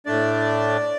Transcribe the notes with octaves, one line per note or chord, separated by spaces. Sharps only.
A2 A3 D4 D5